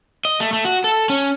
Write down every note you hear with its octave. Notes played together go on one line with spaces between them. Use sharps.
D#5
A3
A3
F#4
A4
C#4